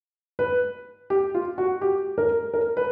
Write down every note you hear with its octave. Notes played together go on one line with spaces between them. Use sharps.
B4
G4
F4
F#4
G4
A#4
A#4
B4